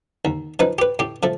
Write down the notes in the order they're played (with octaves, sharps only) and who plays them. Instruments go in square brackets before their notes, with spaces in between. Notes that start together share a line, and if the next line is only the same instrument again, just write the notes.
[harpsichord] D#2
F3 D#4 B4
G4 B4
A2 G4
F3 A3